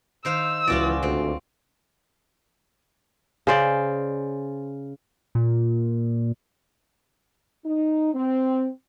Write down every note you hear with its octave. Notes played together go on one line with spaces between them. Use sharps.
D#3 C5 F5 E6
C#2 E3 F4 F#4 D5
D2 C4
C#3 C5 D5
A#2
D#4
C4